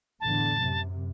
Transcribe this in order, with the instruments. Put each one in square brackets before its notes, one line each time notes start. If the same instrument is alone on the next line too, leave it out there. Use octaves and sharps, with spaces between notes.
[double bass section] E2 A2 D3 [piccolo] A5
[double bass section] F#2 C3